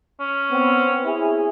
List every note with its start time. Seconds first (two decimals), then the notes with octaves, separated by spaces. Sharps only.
0.20 C#4
0.51 B3 C4
1.05 E4 G#4